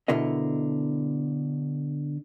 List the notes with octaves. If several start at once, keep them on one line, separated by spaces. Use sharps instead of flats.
B2 D3 E4 A#4 D#5